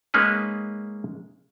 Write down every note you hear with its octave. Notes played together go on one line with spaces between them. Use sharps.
G#3 A#3 C#4 D#4 B4